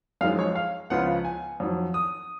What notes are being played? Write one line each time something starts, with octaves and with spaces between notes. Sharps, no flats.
F#2 F3 G#3 D#4 F5
C#5
F5
C#2 C#3 F3 B3 F4 F#5
G#5
F2 D#3 F#3
D#6